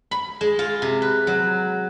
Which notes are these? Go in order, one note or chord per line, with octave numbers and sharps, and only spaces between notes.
B5
G#3
F4
C3
B4
F#3